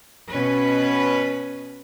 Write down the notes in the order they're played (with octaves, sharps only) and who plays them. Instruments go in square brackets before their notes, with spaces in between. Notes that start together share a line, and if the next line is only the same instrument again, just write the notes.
[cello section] B2 C#4 B4